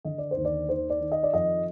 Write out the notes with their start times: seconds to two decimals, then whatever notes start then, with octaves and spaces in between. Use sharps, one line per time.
0.05 D3 D#5
0.18 D5
0.31 C5
0.37 D#2
0.45 D5
0.69 D#3 C5
0.90 D5
1.00 D#3
1.12 D#5
1.23 D5
1.33 F2 D#5